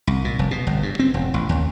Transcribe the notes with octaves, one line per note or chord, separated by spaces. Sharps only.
C2
A#2
F1
B2
G1
G2
C4
E1
A1
D#2